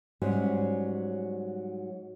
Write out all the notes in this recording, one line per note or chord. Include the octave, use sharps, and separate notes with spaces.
G#2 F#3 G3 C#4